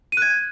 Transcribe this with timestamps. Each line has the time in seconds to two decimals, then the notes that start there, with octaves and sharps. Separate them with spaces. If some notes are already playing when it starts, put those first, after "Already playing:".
0.12 D#7
0.17 F#6
0.22 G#6